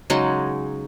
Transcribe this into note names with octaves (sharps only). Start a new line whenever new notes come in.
C#3 F#3 G#3 D#4